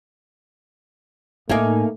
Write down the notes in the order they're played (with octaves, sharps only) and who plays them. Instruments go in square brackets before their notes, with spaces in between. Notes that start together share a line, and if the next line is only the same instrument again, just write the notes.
[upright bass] A2 [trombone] A3 [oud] A#3 D#4 [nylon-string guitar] E5 G#5